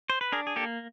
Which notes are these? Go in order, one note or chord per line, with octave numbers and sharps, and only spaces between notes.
C5
B4
D4 G#4 A#4
G#4
A#3 G4 A4